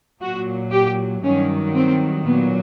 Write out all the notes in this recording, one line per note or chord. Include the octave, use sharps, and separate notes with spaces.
A#2 F#3 F#4
G4
G2 D#3 F#3 C#4
C4
A#2 F#3 B3